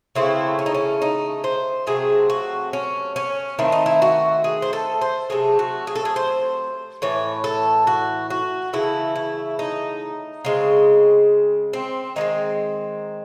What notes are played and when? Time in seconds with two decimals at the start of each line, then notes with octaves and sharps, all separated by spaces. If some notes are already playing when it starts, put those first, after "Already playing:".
0.15 C#3 E3 A3 C4 E4
0.59 C#4
0.66 D#4
0.75 C#4
1.02 D#4
1.44 C5
1.87 C3 F#3 A3 C4 G#4
2.30 F#4
2.73 C#4
3.16 C#4
3.59 D#3 A3 C4 E4
3.72 D#4
3.86 E4
4.02 F#4
4.44 G#4
4.62 C5
4.73 A4
5.02 C5
5.30 C3 F#3 A3 G#4
5.59 F#4
5.87 G#4
5.96 A4
6.05 G#4
6.16 C5
7.02 A2 E3 C#5
7.44 A4
7.87 F#4
8.30 F#4
8.73 C#3 E3 A3 E4
9.16 E4
9.59 D#4
10.45 C#3 G#3 C4
11.73 C4
12.16 D#3 G#3 C4 D#4